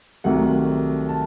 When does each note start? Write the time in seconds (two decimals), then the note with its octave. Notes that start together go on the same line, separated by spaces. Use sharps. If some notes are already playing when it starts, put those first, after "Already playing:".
0.24 C2 C3 D#3 F#3 A3 F#5
1.09 A5